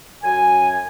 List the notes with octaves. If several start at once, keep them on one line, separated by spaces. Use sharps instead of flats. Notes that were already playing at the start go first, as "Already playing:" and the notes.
F#2 G#5